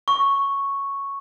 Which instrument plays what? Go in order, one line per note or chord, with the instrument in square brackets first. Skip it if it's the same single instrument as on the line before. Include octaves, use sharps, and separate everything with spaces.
[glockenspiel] C#6